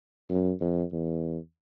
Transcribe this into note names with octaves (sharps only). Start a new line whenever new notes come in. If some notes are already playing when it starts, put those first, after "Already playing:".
F#2
F2
E2